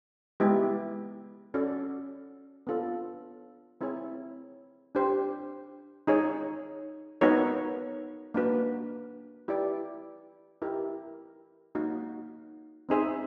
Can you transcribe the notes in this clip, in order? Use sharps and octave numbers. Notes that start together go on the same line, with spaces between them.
G#3 B3 E4 G4
C#4 F#4 A4 D5
B3 D4 F4 A4 C#5
C4 E4 G#4 C#5
D4 G4 C5
D#4 G#4 C#5
B3 D#4 F#4 A#4 C#5
A#3 D4 F#4 B4
E4 G4 B4 D5
E4 G4 A#4 D#5
A#3 D#4 F#4
C4 D#4 G#4 C5 E5